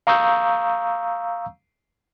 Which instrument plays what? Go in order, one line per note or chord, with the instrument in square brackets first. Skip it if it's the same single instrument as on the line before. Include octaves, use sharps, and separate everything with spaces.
[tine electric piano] F5 A#5 C#6 D#6 E6 G6